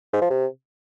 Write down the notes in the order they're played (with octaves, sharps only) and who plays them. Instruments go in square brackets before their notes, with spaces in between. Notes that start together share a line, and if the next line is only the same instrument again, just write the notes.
[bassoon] G#2
F3
C3